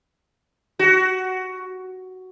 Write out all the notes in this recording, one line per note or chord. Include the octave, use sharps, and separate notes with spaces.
F#4